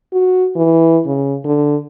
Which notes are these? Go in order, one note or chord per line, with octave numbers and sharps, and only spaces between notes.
F#4
E3
C#3
D3